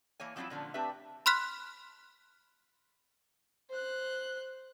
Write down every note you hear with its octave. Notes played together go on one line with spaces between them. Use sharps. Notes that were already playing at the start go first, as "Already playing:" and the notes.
E3 A#3 C#5 G#5
F3 F#3 C4 D4 E4 F4
A#2 D3 F3 C#4
A3 C4 D4 G4 B4 E5
B5 C6 F6 F#6 B6
C5 F#6